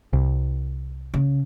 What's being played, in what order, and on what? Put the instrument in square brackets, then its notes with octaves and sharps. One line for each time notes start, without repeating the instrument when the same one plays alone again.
[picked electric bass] C2
[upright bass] C#3